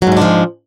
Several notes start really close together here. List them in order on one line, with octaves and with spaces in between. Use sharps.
F#3 G#2 G#3 D4 F3